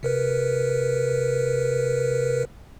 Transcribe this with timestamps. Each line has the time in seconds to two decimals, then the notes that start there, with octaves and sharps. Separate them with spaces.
0.03 C3 A#4 B4